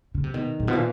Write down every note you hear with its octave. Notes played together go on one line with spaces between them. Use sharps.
C#3
C3
B2 D#3
A#2
B2 F3
A#2 E3